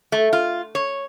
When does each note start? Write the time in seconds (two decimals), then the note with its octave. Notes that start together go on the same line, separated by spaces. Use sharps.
0.12 A3
0.33 F4
0.75 C#5